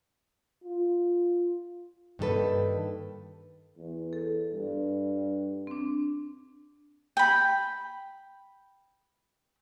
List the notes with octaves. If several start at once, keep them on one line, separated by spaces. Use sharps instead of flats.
F4
G2 D#3 A#3 E4 A4 B4
E2
A4
G2
C4 D4
G5 B5